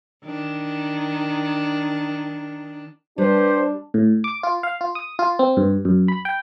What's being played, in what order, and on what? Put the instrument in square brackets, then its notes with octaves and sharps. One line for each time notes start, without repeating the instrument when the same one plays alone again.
[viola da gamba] D#3 D4
[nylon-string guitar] G3 [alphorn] D4 [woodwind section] G4 B4 C5
[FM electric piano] A2
D6
F4
F5
F4
D#6
F4
C4
G2
F#2
B5
G5